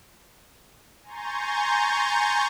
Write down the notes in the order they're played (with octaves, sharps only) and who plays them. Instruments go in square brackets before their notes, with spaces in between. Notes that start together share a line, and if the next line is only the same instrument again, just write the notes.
[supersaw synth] G#5 A#5 C6 C#6 G6 A6